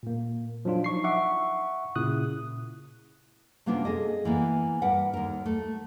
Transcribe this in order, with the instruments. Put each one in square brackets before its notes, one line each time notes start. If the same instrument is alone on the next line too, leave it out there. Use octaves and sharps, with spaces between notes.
[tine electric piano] A#2 A#3
F3 F#3 D4 F4
D#4 C#6 C7
E5 F#5 C#6 D6
A#2 C#3 E4 D#6 F#6
[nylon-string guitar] C3 A#3 B3 C#4 D4 F4
G#4 A4 D#5
E3 A#3 B3
G2 A#4 B4 F#5
D#2 A#4
A3